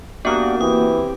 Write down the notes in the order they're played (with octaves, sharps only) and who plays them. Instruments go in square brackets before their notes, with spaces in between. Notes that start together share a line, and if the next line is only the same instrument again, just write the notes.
[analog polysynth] A#3 F#4 [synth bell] B3 D#6 [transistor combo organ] D4 G4 D5
[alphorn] E3 [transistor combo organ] C4 G4 [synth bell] D#6